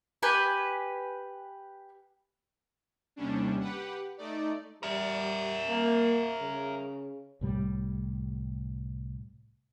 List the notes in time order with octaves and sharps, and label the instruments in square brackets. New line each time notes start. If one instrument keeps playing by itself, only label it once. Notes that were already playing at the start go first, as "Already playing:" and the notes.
[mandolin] G4 B4 G#5
[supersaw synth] D#2 C3 G3 C#4 D4
G4 B4 F#5
A3 D#4 D5
[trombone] G3 [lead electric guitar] A#4 E5
[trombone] A#3
C#3
[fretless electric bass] C2 A2 G3